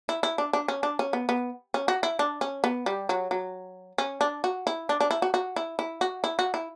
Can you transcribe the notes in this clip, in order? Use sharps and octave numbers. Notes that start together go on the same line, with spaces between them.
E4
E4
D4
D4
C#4
D4
C#4
B3
B3
C#4
F#4
E4
D4
C#4
B3
G3
F#3
F#3
C#4
D4
F#4
E4
D4
D4
E4
F#4
F#4
E4
E4
F#4
E4
F#4
E4